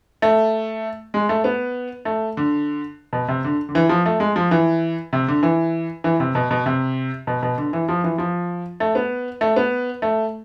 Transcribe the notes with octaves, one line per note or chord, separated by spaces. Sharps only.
A3
G#3
A3
B3
A3
D3
B2
C3
D3
D3
E3
F3
A3
G#3
F3
E3
C3
D3
E3
E3
C3
B2
B2
C3
B2
B2
D3
E3
F3
E3
F3
A3
B3
A3
B3
A3